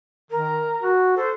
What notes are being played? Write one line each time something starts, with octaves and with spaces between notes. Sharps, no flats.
D#3 A#4
F#4
A4 C5